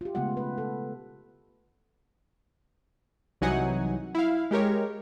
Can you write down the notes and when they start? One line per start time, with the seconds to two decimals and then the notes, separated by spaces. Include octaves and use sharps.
0.01 F4 G4
0.15 C#3 G#3 A3 B3 F4 F#5
0.37 B4
0.58 A4
3.41 C2 E3 F#3 D#4 F#5 G#5
4.15 E4 F5
4.51 G#3 G4 A#4 C#5